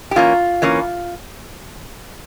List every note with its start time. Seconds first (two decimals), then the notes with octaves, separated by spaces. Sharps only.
0.11 G4
0.16 E3 A#3 C#4 F4
0.62 E3 A#3 C#4